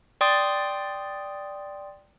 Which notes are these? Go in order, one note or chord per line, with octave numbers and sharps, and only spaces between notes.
D5 G5 C6 D#6 A6